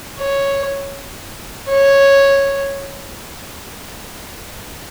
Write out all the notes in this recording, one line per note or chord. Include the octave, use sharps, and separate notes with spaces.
C#5
C#5